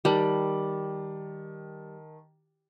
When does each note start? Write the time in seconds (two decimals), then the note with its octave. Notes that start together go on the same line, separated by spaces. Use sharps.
0.05 D#3 G3 A5 F#7